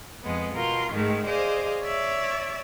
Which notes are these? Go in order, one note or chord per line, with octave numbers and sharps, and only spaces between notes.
F2 G#3 B3
B2 F4 A#4 C6
G#2 D#3 G#3 A3
G#4 C5 D5 D#5 F5 G#5
C#5 D5 E5